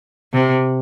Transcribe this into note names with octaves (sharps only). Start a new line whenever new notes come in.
C3